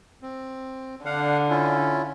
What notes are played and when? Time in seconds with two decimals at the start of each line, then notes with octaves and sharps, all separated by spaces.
0.22 C4
1.05 D3 D4 F5 F#5
1.49 C#4 E4 F4